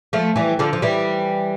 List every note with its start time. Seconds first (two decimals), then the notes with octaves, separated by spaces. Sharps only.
0.13 F3 A3
0.36 E3 G3
0.59 D3 F3
0.73 F3
0.82 E3 G3